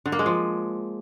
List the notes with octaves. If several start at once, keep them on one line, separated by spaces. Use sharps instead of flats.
D3
A#3
G#3
F3